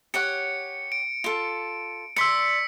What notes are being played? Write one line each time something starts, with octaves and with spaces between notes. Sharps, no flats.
G4 C#5 F#5 C#7
D7
F4 A4
D5 C6 E6 B6 C#7